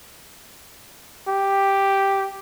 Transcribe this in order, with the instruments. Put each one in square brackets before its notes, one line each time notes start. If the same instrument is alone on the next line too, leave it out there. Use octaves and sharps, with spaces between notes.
[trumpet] G4